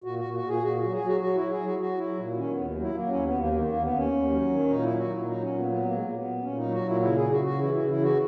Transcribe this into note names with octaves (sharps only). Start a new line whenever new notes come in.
A#2 F#4
F#4
A#2
F#4
A#2 G#4
A#2 F#4
F#3 F#4
G#4
F#3
F#4
F#3 F#4
F#3 E4
G#4
F#3
F#4
F#3 F#4
F#3 E4
A#2
D#3 C#4
B3
D#2
F#3
E4
F#3 A#3
C#4
D#2
B3
D#2 A#3
D#3 A#3
A#3
D#2
B3
D#2 C#4
D#2
F#3
D#3
A#2 D#4
F#3 E4
F#4
A#2
F#3 D#4
A#2 C#4
B3
F#3
B3
A#2 A#3
G#3
A#2 A#3
B3
A#2
A#2 C#4
F#3 D#4
F#4
A#2 E4
C#3 E4
C#3 G#4
F#4
C#3
F#4
E3 E4
C#3 E4
E4
E3
F#4